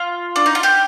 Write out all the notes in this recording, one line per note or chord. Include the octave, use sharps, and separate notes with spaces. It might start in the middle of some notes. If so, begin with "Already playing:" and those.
Already playing: F4
D4
D#4
F4
G4